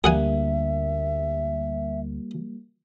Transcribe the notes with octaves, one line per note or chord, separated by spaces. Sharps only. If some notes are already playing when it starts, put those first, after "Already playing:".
D2 G3 A#3 G#4 E5 F#5 G#5